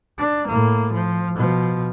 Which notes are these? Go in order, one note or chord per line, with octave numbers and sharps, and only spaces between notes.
D4
A2 A#3
F3
B2 F3